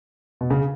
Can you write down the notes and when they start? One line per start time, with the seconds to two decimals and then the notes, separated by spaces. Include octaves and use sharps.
0.41 B2
0.50 C#3